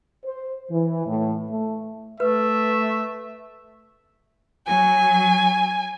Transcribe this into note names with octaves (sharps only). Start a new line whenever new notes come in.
C5
E3
A2
A3
A3 B4 E5
F#3 G#5